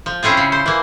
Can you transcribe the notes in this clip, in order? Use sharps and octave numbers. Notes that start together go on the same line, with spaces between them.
F3
C4 C#4 E4 F4 G#4
C#3
C5
E3 A#3